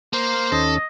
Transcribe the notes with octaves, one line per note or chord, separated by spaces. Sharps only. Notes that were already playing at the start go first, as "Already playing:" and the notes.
A#3 C5
D#2 C#4 A4 D#5